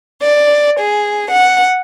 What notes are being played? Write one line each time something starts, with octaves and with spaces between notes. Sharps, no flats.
D5
G#4
F#5